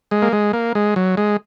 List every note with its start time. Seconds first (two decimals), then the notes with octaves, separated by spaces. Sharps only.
0.11 G#3
0.22 A#3
0.33 G#3
0.53 A#3
0.75 G#3
0.96 F#3
1.17 G#3